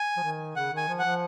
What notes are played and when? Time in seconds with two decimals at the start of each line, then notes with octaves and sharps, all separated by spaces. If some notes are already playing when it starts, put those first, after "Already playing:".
Already playing: G#5
0.17 F3
0.23 D#3
0.56 C#3 F#5
0.72 D#3 G#5
0.88 F3
0.99 F#5
1.04 F3